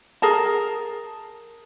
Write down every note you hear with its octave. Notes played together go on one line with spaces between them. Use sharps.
G#4 A#4 A5